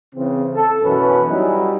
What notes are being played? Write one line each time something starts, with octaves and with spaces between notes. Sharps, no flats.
C#3 E3 C4
A4
F#2 B2 E3 C#4 B4
F#3 G3 C#4 D#4 E4